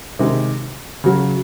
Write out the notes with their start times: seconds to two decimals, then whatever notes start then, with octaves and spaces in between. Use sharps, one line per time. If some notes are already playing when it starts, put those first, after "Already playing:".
0.19 C3 D#3 G#3
1.04 C#3 F#3